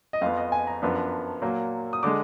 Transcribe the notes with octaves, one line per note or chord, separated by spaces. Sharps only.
D#5
F2 F3 B3 F5
D#5
G#5
A#5
F#2 F3 B3 D4
A#2 F#3 A#3
D#6
D3 G#3 D6